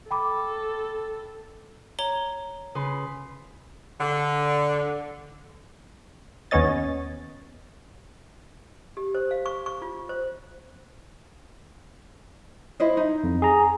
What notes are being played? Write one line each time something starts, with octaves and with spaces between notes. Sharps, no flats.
A4 G5 B5 D6
C#5 A#5 G7
C#3 B4 C6
D3
D#2 B3 C#4 C#5 D#5 A6
G4
C5
F5
C#6
C#6
F4
C5
E4 C5 D#5
D#4
F2
G#4 A#5